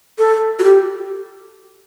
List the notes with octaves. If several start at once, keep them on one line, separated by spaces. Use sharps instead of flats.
A4
F#4
G4